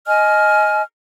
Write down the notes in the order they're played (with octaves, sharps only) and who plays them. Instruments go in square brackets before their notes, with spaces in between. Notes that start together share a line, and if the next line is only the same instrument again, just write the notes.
[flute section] D#5 G#5 F6